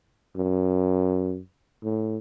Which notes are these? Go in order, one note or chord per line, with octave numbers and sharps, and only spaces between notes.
F#2
A2